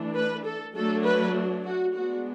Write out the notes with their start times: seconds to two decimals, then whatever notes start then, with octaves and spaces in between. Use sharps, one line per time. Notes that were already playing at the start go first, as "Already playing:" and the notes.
Already playing: E3 A3 D4
0.15 B4
0.45 A4
0.75 F#3 A3 D4 A4
1.05 B4
1.64 F#4
1.94 G#3 B3 D4 F#4